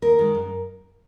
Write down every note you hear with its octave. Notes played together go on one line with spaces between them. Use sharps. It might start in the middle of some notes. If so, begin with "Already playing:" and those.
D#2 A#4
D#3 G#3
F#2